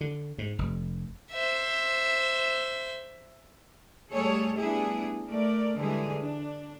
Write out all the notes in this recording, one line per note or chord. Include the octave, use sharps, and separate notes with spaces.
D3
G#2
F1
C5 E5
G3 A3 G#4 A4 C#5
G3 B3 D4 E4 G#4
A3 A#4 D5
D3 E3 G3 G#3 G#4
D4